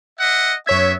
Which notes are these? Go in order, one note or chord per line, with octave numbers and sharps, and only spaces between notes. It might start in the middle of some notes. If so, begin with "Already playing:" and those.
D#5 E5 F#5
F#2 B3 C#5 E5 G#6